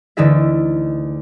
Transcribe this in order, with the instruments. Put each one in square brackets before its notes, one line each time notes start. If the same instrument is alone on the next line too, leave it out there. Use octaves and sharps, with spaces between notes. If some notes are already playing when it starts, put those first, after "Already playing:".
[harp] D2 D3 E3 D#4 G#4 E5